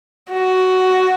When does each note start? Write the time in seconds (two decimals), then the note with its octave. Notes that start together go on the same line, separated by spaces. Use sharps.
0.32 F#4